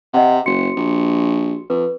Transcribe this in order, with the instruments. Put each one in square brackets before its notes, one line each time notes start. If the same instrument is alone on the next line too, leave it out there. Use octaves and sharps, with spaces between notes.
[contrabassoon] C3 [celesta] D#5 F#5
[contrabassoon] F#1 [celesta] F#4 C6 C#7
[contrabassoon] A#1
[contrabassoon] F2 [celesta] B4